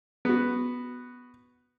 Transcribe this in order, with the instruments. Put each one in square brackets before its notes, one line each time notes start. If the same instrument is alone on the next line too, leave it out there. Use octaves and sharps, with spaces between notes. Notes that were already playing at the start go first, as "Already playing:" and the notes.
[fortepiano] B3 F#4